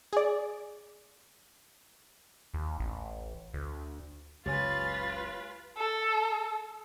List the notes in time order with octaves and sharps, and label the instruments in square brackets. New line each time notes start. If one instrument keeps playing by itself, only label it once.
[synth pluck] G#4 D5
[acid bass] D#2
A1
D2
[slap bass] F#1 C#2 [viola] F4 B4 [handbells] G4 C#5 G#5 [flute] A6
[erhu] A4